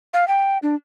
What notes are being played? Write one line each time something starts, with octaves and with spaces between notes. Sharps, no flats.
F5
G5
D4